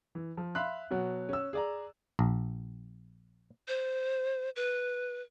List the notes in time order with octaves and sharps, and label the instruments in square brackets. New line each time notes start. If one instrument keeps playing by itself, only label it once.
[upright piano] E3
F3
E5 F5 B5 C6 F#6
B2 F#3 F#4
C#4 E6
G#4 D5 A#5
[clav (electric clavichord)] A#1
[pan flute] C5
B4